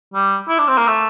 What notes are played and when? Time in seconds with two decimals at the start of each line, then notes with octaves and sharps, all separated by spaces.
0.14 G3
0.48 E4
0.58 D4
0.68 C4
0.78 A#3
0.87 A3